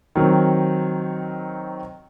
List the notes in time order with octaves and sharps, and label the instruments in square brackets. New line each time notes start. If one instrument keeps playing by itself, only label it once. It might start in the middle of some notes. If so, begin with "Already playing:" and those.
[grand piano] D#3 F#3 C4